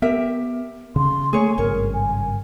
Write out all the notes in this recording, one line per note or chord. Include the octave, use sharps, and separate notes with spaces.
B3 G4 A#4 E5
C#3 C6
A3 A#3 G#4 C#5 G#5
G#1 G2 C#3 A#4 C#5
G#5